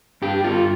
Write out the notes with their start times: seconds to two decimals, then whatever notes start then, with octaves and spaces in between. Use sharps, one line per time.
0.22 G2 G4
0.44 G2 F4